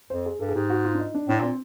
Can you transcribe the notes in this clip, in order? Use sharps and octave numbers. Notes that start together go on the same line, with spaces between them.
F2 C5
G#4
G2 A4
G#4
G#2 G4
F#4
F4
D4
D#4
D4
A2 D4
A#2 C4